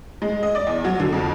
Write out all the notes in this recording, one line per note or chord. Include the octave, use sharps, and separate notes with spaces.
G#3
D#5
D5
E2
F#3
D3
F2